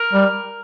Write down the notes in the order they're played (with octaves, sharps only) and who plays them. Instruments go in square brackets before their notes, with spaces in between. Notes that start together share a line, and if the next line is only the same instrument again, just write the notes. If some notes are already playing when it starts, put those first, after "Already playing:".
Already playing: [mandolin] A#4
[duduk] G3